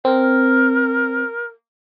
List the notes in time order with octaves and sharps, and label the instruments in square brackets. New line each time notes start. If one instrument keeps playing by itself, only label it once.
[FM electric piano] C4 [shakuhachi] A#4